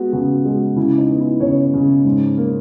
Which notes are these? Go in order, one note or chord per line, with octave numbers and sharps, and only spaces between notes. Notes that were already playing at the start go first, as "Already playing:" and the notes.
Already playing: G#3 B3 F#4 G#4
C#3 F#4
G#3
C#3 E4
D#4
B3
E4
C#3 C#5
C#3
G#2
A#3